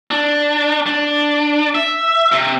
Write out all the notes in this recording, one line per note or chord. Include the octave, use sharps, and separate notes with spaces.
D4
D4
E5
C3